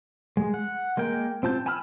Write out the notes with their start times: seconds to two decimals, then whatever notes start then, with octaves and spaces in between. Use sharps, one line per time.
0.37 G#3
0.54 F#5
0.97 G#3 A#3 A#4 G5
1.43 C4 F4 A5 G6
1.66 G#5 A5 B5 E6 F6